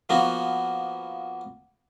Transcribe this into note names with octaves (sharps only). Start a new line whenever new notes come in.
F3 A#3 B3 F#4